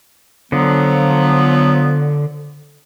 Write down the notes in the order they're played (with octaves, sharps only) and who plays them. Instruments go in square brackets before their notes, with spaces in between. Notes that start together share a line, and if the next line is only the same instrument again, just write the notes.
[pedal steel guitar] D3 [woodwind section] F3 F#3 B3